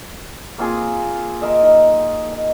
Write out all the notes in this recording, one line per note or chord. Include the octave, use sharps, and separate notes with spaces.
A#3 C4 F4 G#4
A#4 D#5 E5 C6
D#4
D#5